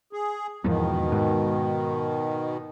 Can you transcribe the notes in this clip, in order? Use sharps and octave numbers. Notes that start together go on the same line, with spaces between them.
G#4
E2 G#2 B2 D#3 F3
G#2